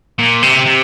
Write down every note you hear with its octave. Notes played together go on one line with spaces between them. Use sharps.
A#2
C3
C3